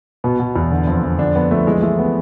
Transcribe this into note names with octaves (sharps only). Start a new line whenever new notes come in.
B2 B3
B2
E2
D3
F2
F2
D3 D4
F2 B3
F2 A3
E3 G#3
E3 A3
B3